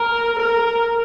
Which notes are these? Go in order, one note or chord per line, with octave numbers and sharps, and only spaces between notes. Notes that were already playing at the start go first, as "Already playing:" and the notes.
Already playing: A#4
A#4